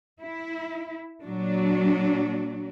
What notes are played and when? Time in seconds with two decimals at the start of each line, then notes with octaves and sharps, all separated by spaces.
0.21 E4
1.23 A#2 F#3 D4